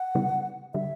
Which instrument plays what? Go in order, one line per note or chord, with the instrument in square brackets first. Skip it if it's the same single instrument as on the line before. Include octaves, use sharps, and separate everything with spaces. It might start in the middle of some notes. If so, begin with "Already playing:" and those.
Already playing: [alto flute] F#5
[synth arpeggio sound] C#3 E3 G3 B3
[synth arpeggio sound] D3 G3 [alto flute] E5